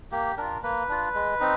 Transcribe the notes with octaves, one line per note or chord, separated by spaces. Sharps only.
A#3 G4
D4 F4 A#4
A#3 B4
D4 F4
G#3
C4 D#4